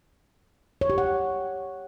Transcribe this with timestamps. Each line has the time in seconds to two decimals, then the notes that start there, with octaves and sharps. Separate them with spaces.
0.81 C#5
0.90 G4
0.98 F#5